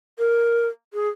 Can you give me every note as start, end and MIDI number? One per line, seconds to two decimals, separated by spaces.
0.19 0.67 70
0.93 1.08 68